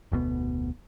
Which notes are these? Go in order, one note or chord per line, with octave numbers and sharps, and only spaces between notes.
F1 D2 B2 B3